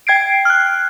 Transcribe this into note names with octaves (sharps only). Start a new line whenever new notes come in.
G5 G#6 C7 D7
F6 F#6